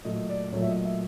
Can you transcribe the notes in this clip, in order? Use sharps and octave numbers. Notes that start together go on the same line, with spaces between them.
A#2 F#3 A3 D#5
D5
A#2 F#3 A3 C#5
E5
D#5
E5